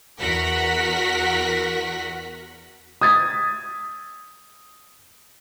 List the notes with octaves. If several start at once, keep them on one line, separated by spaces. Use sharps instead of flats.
E2 F#4 A#4 F#5 B6
D#6 E6 G#6 A6 B6